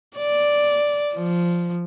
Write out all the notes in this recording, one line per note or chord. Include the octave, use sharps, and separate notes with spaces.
D5
F3